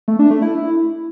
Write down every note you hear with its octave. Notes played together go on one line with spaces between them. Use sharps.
A3
D4
A3
E4